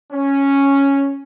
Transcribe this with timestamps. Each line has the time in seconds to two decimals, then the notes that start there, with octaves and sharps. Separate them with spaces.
0.12 C#4